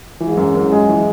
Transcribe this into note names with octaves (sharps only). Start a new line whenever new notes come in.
G#2 E3
F#2
F#2
G#3
E3